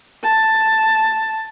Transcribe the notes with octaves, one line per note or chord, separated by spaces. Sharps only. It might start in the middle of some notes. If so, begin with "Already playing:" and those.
A5